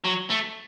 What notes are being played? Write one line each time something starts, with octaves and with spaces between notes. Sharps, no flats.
F#3
A3